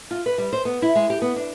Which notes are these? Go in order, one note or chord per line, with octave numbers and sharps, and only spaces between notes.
F4
B4
G3
C5
B3
E4
G#3
G4
B3
D4